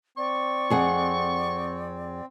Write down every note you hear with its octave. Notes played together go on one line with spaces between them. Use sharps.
C4 D5 C#6
F2 G#4 F#5